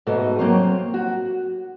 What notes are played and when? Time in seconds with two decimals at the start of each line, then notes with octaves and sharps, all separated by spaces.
0.07 G#2 B2 A3 F#4 D#5
0.39 F#3 A#3 C4 C5 C#5
0.94 F#4